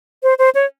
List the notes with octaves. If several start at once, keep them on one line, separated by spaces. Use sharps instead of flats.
C5
C5
C#5